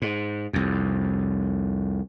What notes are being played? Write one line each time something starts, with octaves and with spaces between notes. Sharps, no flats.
G#2
C2 F2